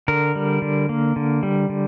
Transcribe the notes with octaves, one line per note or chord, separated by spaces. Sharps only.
D3 A#4
G3
D3
A#3
D3
G3
D3